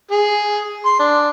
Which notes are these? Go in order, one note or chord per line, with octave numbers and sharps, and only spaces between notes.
G#4
C6
D4